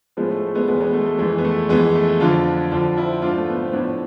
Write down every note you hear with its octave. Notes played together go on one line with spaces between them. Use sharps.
A2 F3 G#3 B3
A3
A3
G#3 B3
E2 B2 G#3 B3
G#3 B3
A3
A3
F2 E3 G#3
B3
A3
F2 E3 G#3 B3
A3
F2 D3 F3 D4 F4
F2 D3 F3 D4 F4
C4 E4
G#2 F3 D4 F4
A3
B3
C4
A2 F3 B3 D4